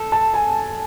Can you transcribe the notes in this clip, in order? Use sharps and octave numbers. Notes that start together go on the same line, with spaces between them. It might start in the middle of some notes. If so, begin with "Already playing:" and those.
Already playing: A4
A5
G#5